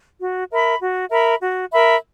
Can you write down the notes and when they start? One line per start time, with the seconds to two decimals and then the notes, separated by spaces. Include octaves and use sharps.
0.20 F#4
0.51 A#4 E5 B5
0.81 F#4
1.11 A#4 E5 B5
1.41 F#4
1.71 A#4 E5 B5